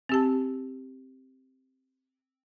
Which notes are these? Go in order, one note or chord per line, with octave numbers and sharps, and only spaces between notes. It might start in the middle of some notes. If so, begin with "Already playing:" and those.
C4 G4 A5